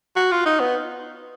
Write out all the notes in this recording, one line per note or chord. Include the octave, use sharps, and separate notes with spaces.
F#4
F4
D#4
B3